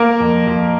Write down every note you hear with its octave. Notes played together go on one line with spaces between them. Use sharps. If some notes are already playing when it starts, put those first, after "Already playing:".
Already playing: A#3 A#4
F2
F2